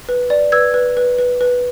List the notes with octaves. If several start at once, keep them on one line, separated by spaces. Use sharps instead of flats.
B4
D5
B4 E6 G#6
B4
B4
B4
B4